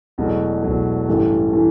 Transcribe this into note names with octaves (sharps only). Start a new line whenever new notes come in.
E1 E2 B2 F#3 A3
E1 E2 B2 F#3 A3
A1 G2 E3 A3
E3 A3